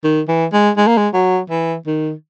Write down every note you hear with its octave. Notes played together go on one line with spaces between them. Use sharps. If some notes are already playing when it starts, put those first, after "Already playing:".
D#3
E3
G#3
G#3
A#3
G#3
F#3
E3
D#3